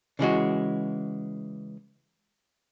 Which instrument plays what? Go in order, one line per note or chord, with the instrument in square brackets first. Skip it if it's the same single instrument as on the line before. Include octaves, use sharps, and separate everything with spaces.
[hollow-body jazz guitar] C#3 E3 G#3 F#4